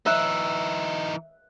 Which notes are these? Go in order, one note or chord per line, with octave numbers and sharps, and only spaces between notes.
E3 D#4 E5 F#6